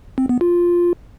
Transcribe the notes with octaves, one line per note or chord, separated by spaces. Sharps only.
C4
B3
F4